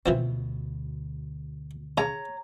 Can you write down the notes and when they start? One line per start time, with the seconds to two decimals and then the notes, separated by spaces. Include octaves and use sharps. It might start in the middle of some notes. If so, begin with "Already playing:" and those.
0.06 D2 B2 E3 F3 C4
1.98 C#3 C#5 A#5